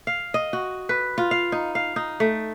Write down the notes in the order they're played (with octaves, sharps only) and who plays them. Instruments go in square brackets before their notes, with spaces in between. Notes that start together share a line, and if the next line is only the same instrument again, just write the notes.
[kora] F5
D#5
F#4
B4
F4
F5
D#4
F5
D#4
A3